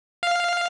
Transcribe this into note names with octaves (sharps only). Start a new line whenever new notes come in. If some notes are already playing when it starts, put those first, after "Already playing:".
F5